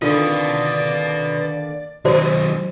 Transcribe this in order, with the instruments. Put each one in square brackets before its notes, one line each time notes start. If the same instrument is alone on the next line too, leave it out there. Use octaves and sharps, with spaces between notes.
[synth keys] D3 D#3 A#3 [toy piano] F4 [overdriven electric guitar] B4 D#5 [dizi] D5
[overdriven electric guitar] D#3 F#3 [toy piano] F#4 C5 D5 [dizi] D#5